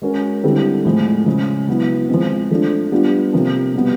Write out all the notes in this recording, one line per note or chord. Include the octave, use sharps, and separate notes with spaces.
G#3 C#4 F#4 A#4
D3 G3 C4 E4 A4
A2 F3 G#3
C#3 F3 G#3
F#3 B3 E4
F3 G#3 C4
F3 A3 D4 F4
G3 B3 D4 F4
C3 F3 A#3
B2 G3 B3